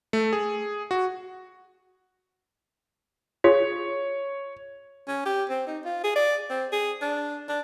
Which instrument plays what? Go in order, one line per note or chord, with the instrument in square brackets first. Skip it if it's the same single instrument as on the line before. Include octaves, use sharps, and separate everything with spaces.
[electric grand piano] A3
G#4
F#4
[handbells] F4 G#4 [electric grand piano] C#5
[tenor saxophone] C#4
G4
C4
D#4
F4
G#4
D5
C4
G#4
D4
D4